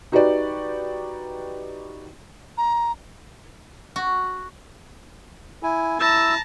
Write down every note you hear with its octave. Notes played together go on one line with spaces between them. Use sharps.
D#4 F#4 G4 B4 D5
A#5
F#4
E4 G#5
E4 A5 A#5 E6